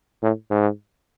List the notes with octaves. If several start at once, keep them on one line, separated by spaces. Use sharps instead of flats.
A2
G#2